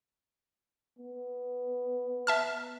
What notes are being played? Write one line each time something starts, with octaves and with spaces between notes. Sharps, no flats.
B3
E5 A5 F6